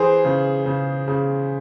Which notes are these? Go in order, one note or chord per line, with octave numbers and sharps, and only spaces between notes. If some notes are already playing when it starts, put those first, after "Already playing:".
Already playing: E3 G#4 C5
C#3
C#3
C#3